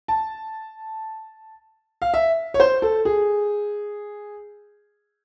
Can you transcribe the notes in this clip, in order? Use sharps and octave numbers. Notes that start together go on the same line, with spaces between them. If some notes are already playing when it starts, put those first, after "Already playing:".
A5
F5
E5
C#5
C5
A4
G#4